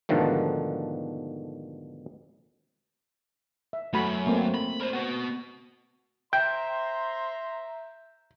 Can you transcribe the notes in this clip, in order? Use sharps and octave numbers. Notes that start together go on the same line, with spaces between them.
G#2 B2 D3 D#3 F3 A3
E5
F#2 A3 F#4 B5
A3 A#3 C4
B5
A#4 C5
B3 F#4
C5 E5 G5 A#5 C6 G6